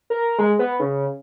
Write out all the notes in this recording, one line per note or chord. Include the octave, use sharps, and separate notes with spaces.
A#4
G#3
B3
C#3